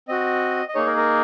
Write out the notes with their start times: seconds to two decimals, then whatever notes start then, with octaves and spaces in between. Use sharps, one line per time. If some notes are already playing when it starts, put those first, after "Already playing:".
0.08 C4 F#4 D#5
0.69 D#5
0.75 A#3 D#4 G#4 C#5
0.86 A#4
0.97 A#4